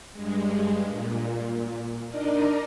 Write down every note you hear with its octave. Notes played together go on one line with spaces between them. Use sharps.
G2 G#3
A#2
D4 D#4 A#4 D5 D#5